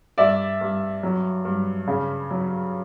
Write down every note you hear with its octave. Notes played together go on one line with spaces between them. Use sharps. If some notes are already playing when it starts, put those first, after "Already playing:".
G2 D5 E5
G2
F#3
G2
C#3
F#3